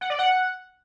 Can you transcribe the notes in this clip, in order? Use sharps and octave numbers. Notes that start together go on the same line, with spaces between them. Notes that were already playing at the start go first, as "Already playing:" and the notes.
F#5
D5
F#5